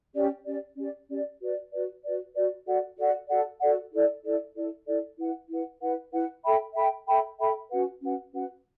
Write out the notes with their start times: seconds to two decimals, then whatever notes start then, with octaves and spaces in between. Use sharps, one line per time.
0.14 C#4 G4 D5
0.46 C#4 G4 D5
0.77 C#4 G4 D5
1.08 C#4 G4 D5
1.40 F#4 B4 D5
1.72 F#4 B4 D5
2.03 F#4 B4 D5
2.35 F#4 B4 D5
2.66 F#4 A4 D5 F#5
2.97 F#4 A4 D5 F#5
3.29 F#4 A4 D5 F#5
3.60 F#4 A4 D5 F#5
3.92 E4 A4 D5
4.23 E4 A4 D5
4.56 E4 A4 D5
4.87 E4 A4 D5
5.18 E4 B4 F#5
5.49 E4 B4 F#5
5.81 E4 B4 F#5
6.13 E4 B4 F#5
6.44 A4 E5 G5 B5
6.76 A4 E5 G5 B5
7.07 A4 E5 G5 B5
7.39 A4 E5 G5 B5
7.71 C#4 F#4 B4 F#5
8.02 C#4 F#4 B4 F#5
8.33 C#4 F#4 B4 F#5